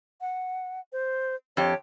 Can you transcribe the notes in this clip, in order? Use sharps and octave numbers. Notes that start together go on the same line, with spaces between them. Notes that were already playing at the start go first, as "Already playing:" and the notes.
F#5
C5
F2 G4 C#5